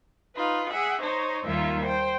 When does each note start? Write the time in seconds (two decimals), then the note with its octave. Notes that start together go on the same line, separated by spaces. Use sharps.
0.35 D#4 F4 B4
0.70 G#4 E5 F#5
1.00 D#4 C5 C#5
1.44 D#2 D#3 G3 A#3 F4 E5
1.84 C5 G5